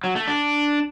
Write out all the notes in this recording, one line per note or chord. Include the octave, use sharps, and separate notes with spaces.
F#3
A3
D4